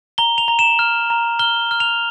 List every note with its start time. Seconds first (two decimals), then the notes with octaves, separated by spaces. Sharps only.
0.18 A#5 G7
0.38 F7
0.48 A#5
0.59 E7
0.79 F6
1.10 A#5
1.39 F6 G7
1.71 F6
1.80 F7